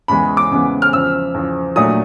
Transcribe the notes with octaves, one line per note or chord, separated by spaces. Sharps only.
E2 C#3 E3 G#3 B3 B5
D6
E2 C#3 E3 G#3 B3
F6
E2 C#3 F3 E6
E2 C#3 F3
A#2 F#3 A3 D4 D#6